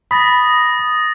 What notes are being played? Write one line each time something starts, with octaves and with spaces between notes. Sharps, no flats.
B5 D#6 A6 A#6